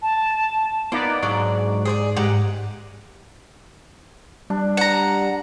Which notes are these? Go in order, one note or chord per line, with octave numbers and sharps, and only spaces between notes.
A5
A#3 B3 D#4 D5
G#2 F#3 D4 D5
G#4 C5 D5
G#2 G4 F#5
G3 D4
F#5 A#5